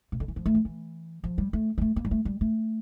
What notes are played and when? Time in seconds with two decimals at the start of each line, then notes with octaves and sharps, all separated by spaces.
0.12 C3
0.20 D3
0.28 E3
0.36 F3
0.46 A3
0.55 F3
0.65 E3
1.24 F3
1.38 G3
1.53 A3
1.78 G3
1.81 A3
1.96 A#3
2.05 G3
2.11 A3
2.25 G3
2.41 A3